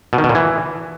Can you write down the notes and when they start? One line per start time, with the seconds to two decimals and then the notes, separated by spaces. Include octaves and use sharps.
0.13 B2
0.18 D#3
0.24 B2
0.29 A#2
0.35 E3